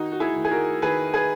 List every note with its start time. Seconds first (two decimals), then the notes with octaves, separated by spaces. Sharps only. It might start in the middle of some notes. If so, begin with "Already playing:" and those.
Already playing: D#3 D#4 F#4
0.12 F#4
0.20 E4 G#4
0.36 D#3
0.45 G#4
0.51 F#4 A#4
0.82 D#3 G#4 B4
1.14 G#4 B4